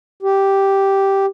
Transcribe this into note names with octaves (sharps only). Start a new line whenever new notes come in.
G4